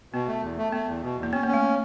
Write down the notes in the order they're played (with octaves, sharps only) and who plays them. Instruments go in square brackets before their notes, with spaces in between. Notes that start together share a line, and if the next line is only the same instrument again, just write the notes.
[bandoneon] B2 [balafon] B3
[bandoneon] A3
E2
A3
[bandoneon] A3 [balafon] B3
[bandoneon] E2
B2
E2
[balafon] A#3
[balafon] B3 [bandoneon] C#4
[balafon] A#3 [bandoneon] C#4
[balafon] A3